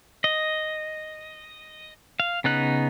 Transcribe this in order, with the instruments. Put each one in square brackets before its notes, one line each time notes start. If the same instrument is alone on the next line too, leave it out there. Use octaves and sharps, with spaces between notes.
[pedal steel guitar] D#5
F5
C#3 B3 D#4 F#6